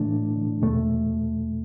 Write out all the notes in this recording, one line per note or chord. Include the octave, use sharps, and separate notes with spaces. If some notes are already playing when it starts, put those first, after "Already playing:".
Already playing: A2 E3 A3 D4
E2 B2 A3